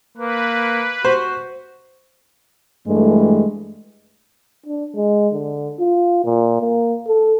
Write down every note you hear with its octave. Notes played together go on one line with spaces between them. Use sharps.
A#3 B4
F#4 C5
G2 E3 G#3 A3
D4
G#3
D3
F4
A#2
A#3
A4